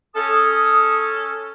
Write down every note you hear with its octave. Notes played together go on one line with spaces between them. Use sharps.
C#4 A4 D#6